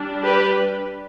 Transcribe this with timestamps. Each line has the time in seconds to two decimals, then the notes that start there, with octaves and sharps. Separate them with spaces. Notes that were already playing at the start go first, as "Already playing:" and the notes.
Already playing: G3 D4
0.23 G4 B4